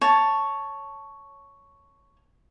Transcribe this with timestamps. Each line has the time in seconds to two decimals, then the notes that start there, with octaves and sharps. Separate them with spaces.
0.01 C#5 A5